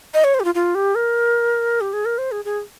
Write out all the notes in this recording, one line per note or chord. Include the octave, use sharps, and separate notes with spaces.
D#5
C#5
C5
G4
F4
F4
G4
A#4
G4
G#4
A#4
C5
G#4
G#4